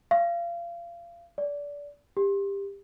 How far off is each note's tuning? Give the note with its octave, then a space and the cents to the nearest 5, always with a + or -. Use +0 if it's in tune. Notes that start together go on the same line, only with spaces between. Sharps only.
F5 -30
D5 -25
G4 +20